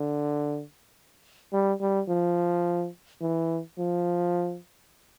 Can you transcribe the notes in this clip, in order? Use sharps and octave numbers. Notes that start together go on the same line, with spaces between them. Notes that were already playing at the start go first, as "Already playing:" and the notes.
Already playing: D3
G3
G3
F3
E3
F3